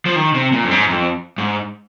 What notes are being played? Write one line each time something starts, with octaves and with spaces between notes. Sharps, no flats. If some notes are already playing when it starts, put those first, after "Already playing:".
F3
D#3
C3
A#2
F2
G#2
F2
G#2